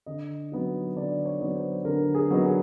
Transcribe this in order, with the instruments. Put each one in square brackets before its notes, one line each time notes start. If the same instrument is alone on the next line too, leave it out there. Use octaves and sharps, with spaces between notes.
[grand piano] D3 D#5
F#3 B3 D#4
D3 D5
C#5
F#3 B3 D#4
C5
D3 A#4
G#4
F#3 B3 D#4
G#4